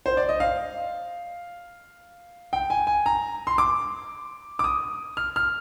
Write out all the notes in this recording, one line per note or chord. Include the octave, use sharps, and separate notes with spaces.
C5
D5
D#5
F5
G5
G#5
G#5
A#5
C6
D6
D6
D#6
F6
F6